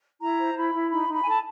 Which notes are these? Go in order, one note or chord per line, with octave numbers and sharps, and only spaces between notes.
E4 A#5
C5
E4 B5
E4
D#4 B5
D#4
B5
G#5
A4 A5